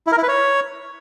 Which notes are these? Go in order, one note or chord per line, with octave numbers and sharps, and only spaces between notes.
E4
A#4
E4
B4
C#5